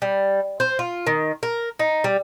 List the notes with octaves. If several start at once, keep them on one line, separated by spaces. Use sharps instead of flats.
G3
C5
F4
D#3
A#4
D#4
G3